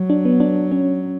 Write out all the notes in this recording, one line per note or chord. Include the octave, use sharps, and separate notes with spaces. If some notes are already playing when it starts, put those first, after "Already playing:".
Already playing: F#3
D4
B3
D4
C#4